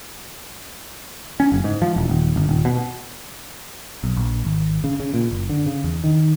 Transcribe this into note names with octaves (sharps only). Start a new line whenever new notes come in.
C#4
F#1
G#2
F3
E1
D#1
G1
D#1
B2
B1
A#1
G#1
C#3
C#3
A#2
F#1
D3
C#3
E2
D#3